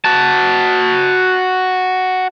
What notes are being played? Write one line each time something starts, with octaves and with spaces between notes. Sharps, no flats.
F#4 A5